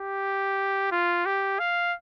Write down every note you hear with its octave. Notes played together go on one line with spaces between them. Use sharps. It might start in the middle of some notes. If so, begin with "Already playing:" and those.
Already playing: G4
F4
G4
F5